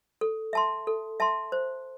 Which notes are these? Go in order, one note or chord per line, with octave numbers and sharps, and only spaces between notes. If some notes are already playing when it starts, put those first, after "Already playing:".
A4
E5 A5 C6
A4
E5 A5 C6
C5